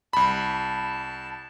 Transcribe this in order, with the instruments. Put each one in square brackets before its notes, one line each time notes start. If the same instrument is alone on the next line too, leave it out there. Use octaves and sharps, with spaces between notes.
[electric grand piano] C2 B5 [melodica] A5